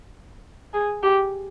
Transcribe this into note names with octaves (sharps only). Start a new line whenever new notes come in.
G#4
G4